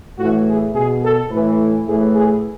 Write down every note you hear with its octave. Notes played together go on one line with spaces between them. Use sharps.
A2 E3 F#4
G#4
B2 G#4
A4
A2 E3 B4
A2 E3 G#4
G#4